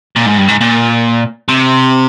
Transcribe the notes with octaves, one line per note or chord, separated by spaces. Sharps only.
A#2
G#2
G2
G#2
A#2
C3